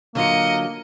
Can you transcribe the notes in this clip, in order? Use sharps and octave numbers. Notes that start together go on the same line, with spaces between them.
D3 F#3 A#3 F4 D#5 C#7